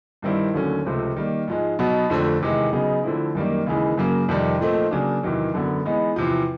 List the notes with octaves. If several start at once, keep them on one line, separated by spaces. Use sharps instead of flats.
G2 D#3 G3 C4 E4
D#2 D3 F#3 A3 C#4
C#2 C3 F3 A3 C4
D#3 G3 A#3
G#2 F3 G#3
B2 F#3 B3 D#4
F2 D3 F3 A3 C4
E2 C3 D#3 G#3
C#3 F#3 B3 D#4 G#4
D3 F3 A3 C4 E4
F#2 D#3 G3 A#3
D#2 C#3 E3 G#3
F#2 C#3 F#3 A#3
F2 C3 D#3 G3
A#2 F3 A3 C4 D#4
C#3 F#3 A#3 D4
E2 C3 D#3 F#3
F#2 D3 F#3 B3
E3 G#3 B3 D#4
E2 C3 F3